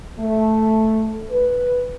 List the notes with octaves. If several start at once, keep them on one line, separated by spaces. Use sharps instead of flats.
A3
B4